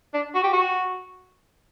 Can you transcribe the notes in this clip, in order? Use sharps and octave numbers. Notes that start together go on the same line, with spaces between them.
D4
F#4
G4
F#4